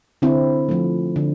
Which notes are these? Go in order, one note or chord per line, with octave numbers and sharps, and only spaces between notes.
D3 C4 E4
F3 A3
D3